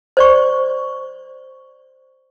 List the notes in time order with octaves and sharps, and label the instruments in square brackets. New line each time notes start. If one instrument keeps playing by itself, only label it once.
[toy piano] C5 D5 C#6